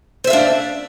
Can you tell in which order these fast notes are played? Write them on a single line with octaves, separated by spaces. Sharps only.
C5 E5 F5 D4